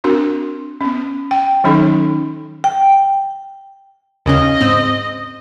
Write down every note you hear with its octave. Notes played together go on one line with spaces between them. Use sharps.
C4 D4 F#4 A#4
B3 C#4
G5
D#3 F#3 C#4 D#4 A4
G5
D#2 C#3 C#4 D#5
G#2 C4